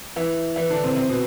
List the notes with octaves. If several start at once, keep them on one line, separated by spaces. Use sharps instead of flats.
E3 E4
E3 E4
D3 D4
C3 C4
C3 C4
B2 B3